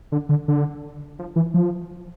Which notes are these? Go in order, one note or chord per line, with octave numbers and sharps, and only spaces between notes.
D3
D3
D3
F3
E3
F3